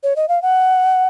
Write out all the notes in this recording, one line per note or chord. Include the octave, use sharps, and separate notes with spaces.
C#5
D#5
F5
F#5